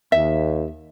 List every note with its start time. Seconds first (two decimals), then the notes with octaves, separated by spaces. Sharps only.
0.12 D#2 E5